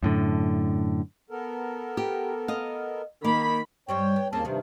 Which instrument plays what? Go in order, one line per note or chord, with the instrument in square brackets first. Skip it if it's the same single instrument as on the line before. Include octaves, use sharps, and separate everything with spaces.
[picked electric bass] F#2 A2 D3
[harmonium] B3 A4 A#4
[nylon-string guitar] G4
D#5 F5
[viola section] D#3 B5 [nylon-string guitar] A#3
[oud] G2 G3 C4 [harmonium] C#5 G5
[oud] B3
[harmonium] D#2 A#3 A5 [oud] C4 C#4 G#4
[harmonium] G2 C3 [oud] D#3 F3